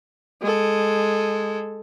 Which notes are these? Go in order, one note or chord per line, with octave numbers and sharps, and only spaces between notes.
G#3 A4